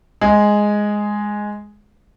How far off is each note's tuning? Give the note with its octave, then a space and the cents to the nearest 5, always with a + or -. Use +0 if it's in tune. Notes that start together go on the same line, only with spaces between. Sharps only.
G#3 +0 G#4 +0